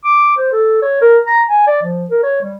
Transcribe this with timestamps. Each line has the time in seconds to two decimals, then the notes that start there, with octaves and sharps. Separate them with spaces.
0.04 D6
0.37 C5
0.52 A4
0.82 C#5
1.01 A#4
1.27 A#5
1.49 G#5
1.67 D5
1.82 F3
2.10 A#4
2.23 C#5
2.41 G3